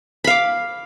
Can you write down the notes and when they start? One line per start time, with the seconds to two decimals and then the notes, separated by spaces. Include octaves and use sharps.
0.24 B5
0.27 F5
0.30 D6